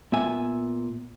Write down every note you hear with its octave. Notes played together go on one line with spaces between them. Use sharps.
A#2 B3 E5 G#5